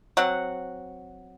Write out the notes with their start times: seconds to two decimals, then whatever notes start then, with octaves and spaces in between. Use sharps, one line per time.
0.17 F#3 C4 F#5